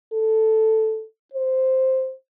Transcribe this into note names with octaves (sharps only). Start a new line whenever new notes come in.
A4
C5